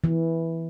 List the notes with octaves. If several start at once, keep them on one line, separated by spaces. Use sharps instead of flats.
E3